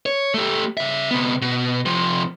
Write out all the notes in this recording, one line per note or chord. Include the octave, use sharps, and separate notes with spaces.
C#5
A3 G4
C#3 E5
C3 B3
B2
C3 F3